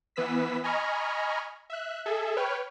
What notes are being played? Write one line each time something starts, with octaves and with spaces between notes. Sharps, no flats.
E3 B3 B4 E6 B6
D#5 G#5 A#5 B5 C#6 F6
E5 F#6
G#4 A4 E5
B4 C#5 G5 F6